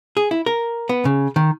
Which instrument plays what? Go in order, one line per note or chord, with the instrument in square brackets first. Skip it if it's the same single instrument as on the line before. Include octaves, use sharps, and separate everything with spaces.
[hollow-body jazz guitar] G#4
E4
A#4
B3
C#3
D#3